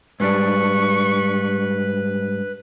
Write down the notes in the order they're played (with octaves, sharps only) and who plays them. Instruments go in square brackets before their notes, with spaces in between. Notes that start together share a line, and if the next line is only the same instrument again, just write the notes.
[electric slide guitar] G#2 G3 D4 [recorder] B4 [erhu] C#6